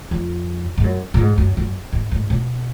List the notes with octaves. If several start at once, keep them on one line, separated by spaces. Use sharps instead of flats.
F2
G#2
F#2
A#2
G#2
F#2
F#2
G#2
G#2
B2